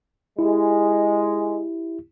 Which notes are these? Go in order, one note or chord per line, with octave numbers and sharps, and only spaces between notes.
G#3 E4 G4